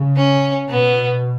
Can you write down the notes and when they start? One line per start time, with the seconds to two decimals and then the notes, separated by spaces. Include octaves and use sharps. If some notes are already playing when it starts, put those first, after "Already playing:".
Already playing: C#3
0.17 C#4
0.68 B2 B3